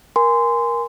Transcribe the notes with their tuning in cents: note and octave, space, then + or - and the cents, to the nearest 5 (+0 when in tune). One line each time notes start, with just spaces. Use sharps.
A#4 +15 G#5 -10 C6 -20